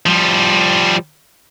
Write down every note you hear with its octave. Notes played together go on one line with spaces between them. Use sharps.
F3 G3